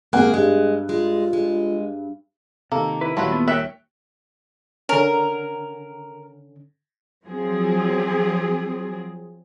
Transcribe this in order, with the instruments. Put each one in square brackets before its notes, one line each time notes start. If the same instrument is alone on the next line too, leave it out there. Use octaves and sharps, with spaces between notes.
[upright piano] G#1 F#5 F#6 [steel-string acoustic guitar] A#3 G#4
[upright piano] G2 [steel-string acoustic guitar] G#3
[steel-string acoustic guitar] G#3 [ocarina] F4
[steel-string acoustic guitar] G#3
[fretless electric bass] C3 D#3 [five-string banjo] A#3 [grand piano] A4
[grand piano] E4 [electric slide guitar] B4
[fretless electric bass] D#2 A#2 G3 [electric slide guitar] F#3 [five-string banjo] A3 F4 B4
[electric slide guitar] B3
[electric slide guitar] A#4 C#5 G5 [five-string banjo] E5 [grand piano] F#6 B6
[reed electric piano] D3 C#4 [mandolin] A#4
[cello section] F3 F#3 C4 G#4